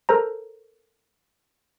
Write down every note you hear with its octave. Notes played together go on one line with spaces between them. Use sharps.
A4 A#4 C5 A#5